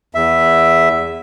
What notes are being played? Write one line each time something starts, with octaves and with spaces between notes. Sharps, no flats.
E2 E5